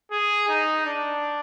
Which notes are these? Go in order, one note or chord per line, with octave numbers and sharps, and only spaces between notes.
G#4
D#4
D4